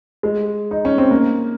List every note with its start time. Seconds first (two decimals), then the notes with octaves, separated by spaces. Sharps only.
0.23 G#3
0.71 D#4
0.85 C#4
0.98 C4
1.11 A#3